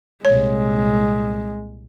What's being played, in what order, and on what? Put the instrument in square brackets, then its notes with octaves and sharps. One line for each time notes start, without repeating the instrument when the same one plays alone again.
[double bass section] C2 A#2 [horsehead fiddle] G#3 [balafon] C#5